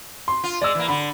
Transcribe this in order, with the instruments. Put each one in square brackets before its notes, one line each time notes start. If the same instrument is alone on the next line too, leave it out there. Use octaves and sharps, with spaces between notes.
[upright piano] C6
[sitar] F4
[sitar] G#3 [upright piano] D5 E6
[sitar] E3 A#3
[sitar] D3 [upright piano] B5